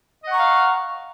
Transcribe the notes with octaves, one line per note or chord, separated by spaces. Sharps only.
D#5 F5 F#5 A#5 C#6